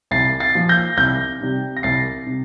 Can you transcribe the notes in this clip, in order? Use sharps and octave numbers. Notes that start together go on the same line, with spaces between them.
C2 A6 C7
A6 C7
A#2 F3
G6 A#6
C2 G6 A#6
C3 G3
A#6
C2 A6 C7
C3